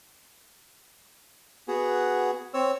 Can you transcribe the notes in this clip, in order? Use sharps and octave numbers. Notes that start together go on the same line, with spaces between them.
B3 F#4 G#4
C4 C#5 E6